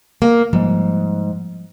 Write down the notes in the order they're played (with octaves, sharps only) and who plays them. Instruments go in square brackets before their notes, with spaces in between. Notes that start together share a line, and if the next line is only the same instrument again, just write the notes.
[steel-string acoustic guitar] A#3
[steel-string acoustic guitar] G#2 [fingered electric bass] F3 G3 A#3